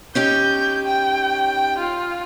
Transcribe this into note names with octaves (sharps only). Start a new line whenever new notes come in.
C#4 D#4 G4 G6
G5
F4